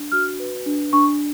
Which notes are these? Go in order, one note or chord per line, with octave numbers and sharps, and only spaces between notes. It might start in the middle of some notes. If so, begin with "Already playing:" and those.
Already playing: D4
F#4 F6
B4
D4
D4 C#6